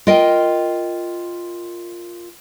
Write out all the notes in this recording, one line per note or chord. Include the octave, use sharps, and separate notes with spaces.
F4 A#4 D#5 G5